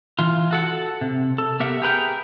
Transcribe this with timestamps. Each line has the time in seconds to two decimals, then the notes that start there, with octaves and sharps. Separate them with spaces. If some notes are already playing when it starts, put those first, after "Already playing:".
0.19 E3 F4
0.51 F#4 A4 F#5
1.01 C3
1.38 A4
1.60 B3 G4 A#4 E5 F#5
1.82 G4 G#4 A#4 B4 F#5 G5